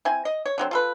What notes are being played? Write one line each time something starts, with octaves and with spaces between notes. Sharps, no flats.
C4 E4 G#5
D#5
C#5
D3 F#3 C4
F4 A4 B4